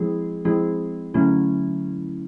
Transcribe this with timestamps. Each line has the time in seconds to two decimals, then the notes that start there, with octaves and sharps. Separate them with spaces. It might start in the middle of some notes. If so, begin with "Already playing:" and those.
Already playing: F3 G#3 C4 E4 G#4
0.45 F3 G#3 C4 E4 G#4
1.14 D3 F#3 A3 C#4 E4